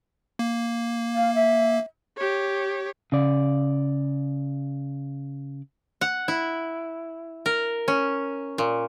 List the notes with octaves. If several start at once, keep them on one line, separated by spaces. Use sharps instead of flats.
A#3
F5
E5
G4 C#5
C#3 D5
F#5
E4
A#4
C#4
A#2